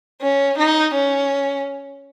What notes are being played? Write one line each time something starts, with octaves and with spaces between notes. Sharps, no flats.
C#4
D#4
C#4